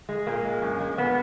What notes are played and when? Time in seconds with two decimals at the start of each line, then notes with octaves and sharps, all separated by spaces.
0.09 G#3
0.27 A#2 A#3
0.45 G#3
0.62 F#2
0.80 G#3
0.98 A#2 B3